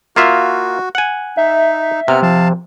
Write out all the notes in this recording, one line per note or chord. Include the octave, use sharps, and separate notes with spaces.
A#3 F4 F#4 E5
F#5 G#5
D#4 E5
C3 B3 A#5 F6
F3 F5 A5